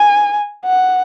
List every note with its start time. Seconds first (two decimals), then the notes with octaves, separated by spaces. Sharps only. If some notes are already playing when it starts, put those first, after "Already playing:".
Already playing: G#5
0.66 F#5